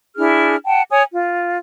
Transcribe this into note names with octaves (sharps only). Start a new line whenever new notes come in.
D4 E4 G#4 F6
F#5 G5 A5
C#5 G#5 D#6
F4